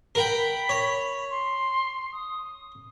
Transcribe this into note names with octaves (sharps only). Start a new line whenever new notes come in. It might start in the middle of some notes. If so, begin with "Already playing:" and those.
A#4 F#5 G5 B5
C#5
C6
D#6